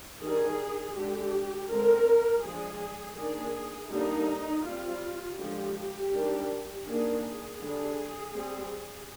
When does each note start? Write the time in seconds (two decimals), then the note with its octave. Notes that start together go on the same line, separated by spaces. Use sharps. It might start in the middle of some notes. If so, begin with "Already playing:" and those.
0.21 D#3 G3 D4 G#4
0.95 D3 G#3 D4 G4
1.69 D3 G#3 C4 A#4
2.42 F3 G#3 D4 G#4
3.16 D#3 A#3 D4 G#4
3.90 D3 G3 A#3 D4 D#4
4.64 G3 C4 F4
5.37 D3 F3 G#3 D4 G4
6.12 D#3 G3 D4
6.86 D#3 A#3 D4 G#4
7.23 G#4
7.59 D3 G3 D4
8.33 G3 C4